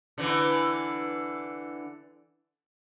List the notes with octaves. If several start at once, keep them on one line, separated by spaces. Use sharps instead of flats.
D3 E3